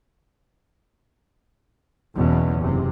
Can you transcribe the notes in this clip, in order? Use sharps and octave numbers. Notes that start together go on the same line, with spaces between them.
F#1 E2 B2 C#4
F#1 C3